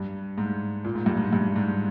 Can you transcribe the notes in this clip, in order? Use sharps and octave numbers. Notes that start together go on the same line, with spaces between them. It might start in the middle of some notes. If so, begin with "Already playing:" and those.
Already playing: G2
G#2
A#2
G#2
G2
G#2
G2
G#2